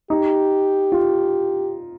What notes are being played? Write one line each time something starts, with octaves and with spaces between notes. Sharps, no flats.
D#4 G4
F4